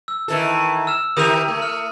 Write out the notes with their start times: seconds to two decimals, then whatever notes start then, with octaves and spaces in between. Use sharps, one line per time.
0.08 E6
0.28 D#3 E3 A4
0.87 E6 F6 E7
1.17 D#3 G4 A#4 D#6 D#7 F7
1.48 A3
1.62 F6